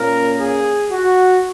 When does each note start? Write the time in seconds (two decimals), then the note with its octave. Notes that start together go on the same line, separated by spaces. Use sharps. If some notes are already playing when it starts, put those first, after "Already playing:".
Already playing: A#2 A#3 C#4 A#4
0.38 G#4
0.91 F#4